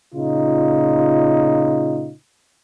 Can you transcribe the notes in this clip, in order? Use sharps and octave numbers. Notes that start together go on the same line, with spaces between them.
A#2 C#3 D#4 F4